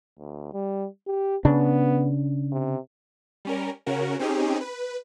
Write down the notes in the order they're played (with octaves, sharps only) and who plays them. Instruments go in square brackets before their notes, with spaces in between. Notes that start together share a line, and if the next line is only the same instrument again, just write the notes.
[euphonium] D2
G3
G4
[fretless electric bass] C#3 D4 [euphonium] B3
[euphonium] C3
[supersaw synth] G3 C#4 A#4
C#3 C#4 F#4 A#4
C4 C#4 D#4 G4 G#4
B4